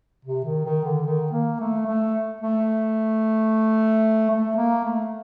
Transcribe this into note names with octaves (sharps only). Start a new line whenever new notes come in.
C3
D#3
D#3
D3
D#3
A#3
A3
A3
A3
A3
A#3
A3